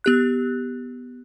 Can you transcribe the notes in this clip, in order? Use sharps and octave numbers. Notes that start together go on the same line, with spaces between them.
B3 G4 F#6